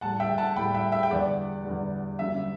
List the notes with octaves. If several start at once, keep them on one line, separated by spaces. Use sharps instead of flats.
A2 G3 F#5 A5
E5 G5
F#5 A5
A2 G3 G5 B5
E5 G5
E5 G5
G5
E2 D3 G3 D5 F#5
E2 D3 G3
F#2 D3 G3 E5